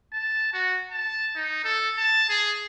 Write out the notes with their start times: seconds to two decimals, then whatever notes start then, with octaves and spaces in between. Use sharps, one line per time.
0.13 A5
0.53 F#4
0.91 A5
1.36 D#4
1.65 A4
1.97 A5
2.29 G#4